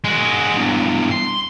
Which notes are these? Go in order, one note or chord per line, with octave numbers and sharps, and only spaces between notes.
G#3 F#4
E2 G2
C6